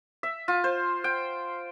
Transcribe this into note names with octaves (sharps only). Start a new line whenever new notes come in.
E5
F4
C5
G5